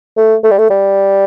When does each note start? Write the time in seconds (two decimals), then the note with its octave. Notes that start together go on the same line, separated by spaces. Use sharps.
0.17 A3
0.44 A3
0.51 G3
0.58 A3
0.70 G3